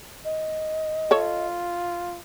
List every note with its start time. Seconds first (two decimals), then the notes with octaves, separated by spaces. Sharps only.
0.25 D#5
1.11 F4 A4 C#5